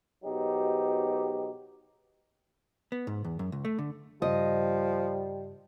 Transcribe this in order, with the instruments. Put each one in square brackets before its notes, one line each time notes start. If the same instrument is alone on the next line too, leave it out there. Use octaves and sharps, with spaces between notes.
[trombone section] G#2 B2 F#3 D#4 G4
[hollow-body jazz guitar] B3
G#2
E2
F#2
C#2
A3
D3
[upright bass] G2 C#3 [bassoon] F3 [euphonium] G3 [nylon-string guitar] D#5